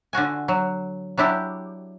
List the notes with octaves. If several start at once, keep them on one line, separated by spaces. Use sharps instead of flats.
D3 F4 F#4 G#5
F#3
F#3 D4 E4 G4